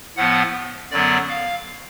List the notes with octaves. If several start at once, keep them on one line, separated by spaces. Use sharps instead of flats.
A2 F3 B3 F#5
F#2 D3 F#3 B3 D5
F5